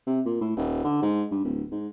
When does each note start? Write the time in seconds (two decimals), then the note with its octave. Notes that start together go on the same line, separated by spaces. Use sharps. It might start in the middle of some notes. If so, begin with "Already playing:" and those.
0.07 C3
0.25 A#2
0.41 A2
0.56 D#1
0.84 D3
1.02 G#2
1.31 G2
1.44 D1
1.72 G#2